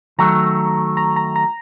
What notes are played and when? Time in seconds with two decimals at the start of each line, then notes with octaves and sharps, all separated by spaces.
0.18 D#3 F#3 A3 A#5
0.97 A#5
1.16 A#5
1.36 A#5